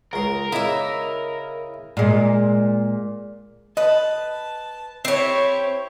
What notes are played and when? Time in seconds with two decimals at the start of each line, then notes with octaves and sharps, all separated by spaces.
0.13 C#2 A#4 C6
0.52 C#3 D#4 E4 E5 D6
1.97 A#2 G#3
3.77 B4 D#5 A5
5.05 C4 E4 G4 C#5